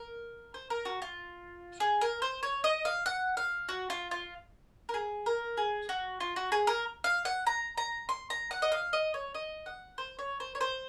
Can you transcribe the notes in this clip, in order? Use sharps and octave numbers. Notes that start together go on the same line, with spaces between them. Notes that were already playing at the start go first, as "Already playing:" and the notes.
Already playing: A#4
C5
A#4
F#4
F4
G#4
A#4
C5
C#5
D#5
F5
F#5
F5
F#4
F4
F4
A#4
G#4
A#4
G#4
F#4
F4
F#4
G#4
A#4
F5
F#5
A#5
A#5
C6
A#5
F#5
D#5
F5
D#5
C#5
D#5
F#5
C5
C#5
C5
C#5
C5